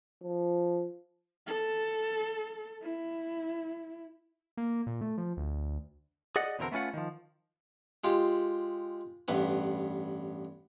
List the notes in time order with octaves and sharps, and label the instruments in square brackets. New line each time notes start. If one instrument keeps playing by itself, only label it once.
[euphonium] F3
[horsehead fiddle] A4
E4
[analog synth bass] A#3
A#2
A3
F3
D2
[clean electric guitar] G#4 D5 D#5 F#5
E2 B2 D3 C4 A#4
A3 B3 C#4 F4 F#5
D#3 F3
[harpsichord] G#3 F4 G4
A1 G2 B3 B4